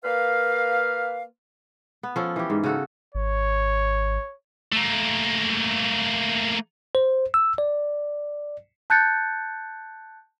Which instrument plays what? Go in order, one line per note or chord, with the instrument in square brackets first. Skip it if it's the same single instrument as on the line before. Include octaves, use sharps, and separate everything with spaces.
[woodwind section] A#3 A#4 B4 F5
[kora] B3
F3 C#4 A4
E3 G4
G#2
C#3 F#4 A4
[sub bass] G#1 [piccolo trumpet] C#5
[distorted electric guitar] A3 A#3
[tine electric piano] C5
E6
D5
[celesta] A5 F#6 G6 A6 C#7